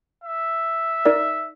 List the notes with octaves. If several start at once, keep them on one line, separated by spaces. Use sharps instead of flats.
E5
D#4 A#4 D5